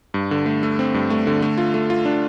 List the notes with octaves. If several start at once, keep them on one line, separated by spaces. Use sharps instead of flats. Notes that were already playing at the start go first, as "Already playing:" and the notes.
G2
D3
A3
A3
C4
G2
A3
D3
A3
F4
A3
F4
D4